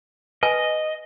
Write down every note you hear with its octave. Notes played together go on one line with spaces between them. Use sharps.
B4 D#5 G#5